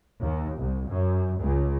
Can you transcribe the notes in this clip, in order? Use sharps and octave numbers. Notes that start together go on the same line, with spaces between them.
D#2
C2
F#2
C#2